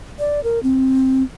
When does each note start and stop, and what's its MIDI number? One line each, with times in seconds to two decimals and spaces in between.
0.19 0.40 74
0.44 0.59 70
0.63 1.23 60